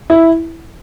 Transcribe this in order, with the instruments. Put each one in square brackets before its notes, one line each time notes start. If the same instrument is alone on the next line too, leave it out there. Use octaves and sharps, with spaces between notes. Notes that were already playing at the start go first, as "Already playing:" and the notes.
[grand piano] E4